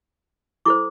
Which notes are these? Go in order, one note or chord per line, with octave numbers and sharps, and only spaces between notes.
E4 A4 C5 D6